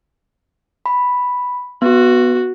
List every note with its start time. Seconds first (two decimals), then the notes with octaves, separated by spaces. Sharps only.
0.86 B5
1.82 B3 F#4